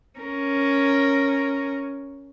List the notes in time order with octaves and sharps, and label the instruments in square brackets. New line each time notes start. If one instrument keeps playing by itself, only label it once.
[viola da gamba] C#4 A#4